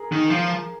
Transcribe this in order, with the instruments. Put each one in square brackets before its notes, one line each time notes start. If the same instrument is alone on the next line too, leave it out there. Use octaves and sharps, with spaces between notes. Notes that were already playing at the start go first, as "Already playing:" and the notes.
Already playing: [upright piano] G#4 A#4
[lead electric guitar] D#3
F3